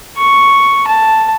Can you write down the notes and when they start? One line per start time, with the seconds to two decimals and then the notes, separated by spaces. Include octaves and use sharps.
0.17 C#6
0.87 A5